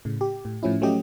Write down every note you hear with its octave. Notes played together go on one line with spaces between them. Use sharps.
A2 C#3
G4
A2
A2 F3 C#4 E4
F3 F#3 A3 C#4 G4 D#5